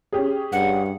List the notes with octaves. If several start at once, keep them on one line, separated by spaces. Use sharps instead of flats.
C#4 G4 G#4
G2 F#5